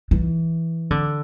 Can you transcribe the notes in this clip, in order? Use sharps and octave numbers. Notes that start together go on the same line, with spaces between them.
E3
D3